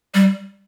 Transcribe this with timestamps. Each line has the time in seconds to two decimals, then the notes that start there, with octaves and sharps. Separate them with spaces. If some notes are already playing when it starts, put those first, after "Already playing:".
0.15 G3